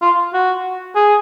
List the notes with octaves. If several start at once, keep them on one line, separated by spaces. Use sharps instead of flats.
F4
F#4
G#4